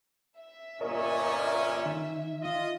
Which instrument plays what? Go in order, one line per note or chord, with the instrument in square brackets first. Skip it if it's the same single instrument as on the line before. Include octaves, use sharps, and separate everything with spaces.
[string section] E5
[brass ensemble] G1 A#2 C#4 [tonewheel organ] A#4 C#5 D#5
[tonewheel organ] D#3
[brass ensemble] F4 D#5